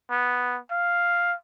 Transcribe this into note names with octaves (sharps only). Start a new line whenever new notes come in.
B3
F5